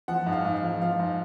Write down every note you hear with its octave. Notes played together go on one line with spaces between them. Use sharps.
F3 F#5
G#2
F5
G#2
F5
F3
F3 F5
G#2